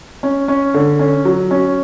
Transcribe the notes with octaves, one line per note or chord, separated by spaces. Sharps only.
C#4
C#4
D3
C#4
F#3
C#4